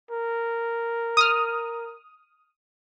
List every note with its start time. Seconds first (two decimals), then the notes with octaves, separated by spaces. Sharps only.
0.11 A#4
1.17 D#6 F6